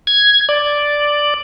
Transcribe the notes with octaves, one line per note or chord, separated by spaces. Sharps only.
G#6
D5